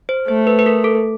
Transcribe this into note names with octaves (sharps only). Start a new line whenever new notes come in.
C5
A3 C5
B4
B4
A#4
A4